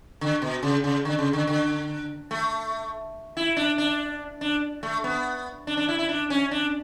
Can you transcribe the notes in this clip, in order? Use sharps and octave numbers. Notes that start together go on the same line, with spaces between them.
D3
B2
C#3
C#3
D3
C#3
D3
D3
A3
E4
D4
D4
D4
A3
B3
D4
D4
E4
E4
D4
C#4
D4